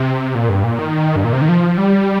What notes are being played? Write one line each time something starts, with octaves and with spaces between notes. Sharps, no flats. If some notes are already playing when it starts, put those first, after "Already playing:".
Already playing: C3
A#2
G2
A#2
D#3
G2
A#2
C3
D#3
F3
G3